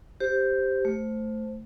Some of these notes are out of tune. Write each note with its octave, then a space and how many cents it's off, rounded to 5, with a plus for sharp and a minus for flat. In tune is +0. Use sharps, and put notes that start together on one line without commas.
G4 +0 C5 +0
A3 +0 C5 +0